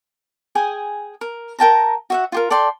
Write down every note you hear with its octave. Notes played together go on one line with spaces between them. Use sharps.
G#4 G5 G#5 D#6
A#4
A#4 G5 A5 A#5
F#4 E5 F#5
F4 G4 A#4
A4 D5 G5 C6